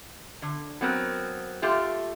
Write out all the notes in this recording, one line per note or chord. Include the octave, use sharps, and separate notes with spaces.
D3
F#3 B3 C4 A#4
A3 F4 G4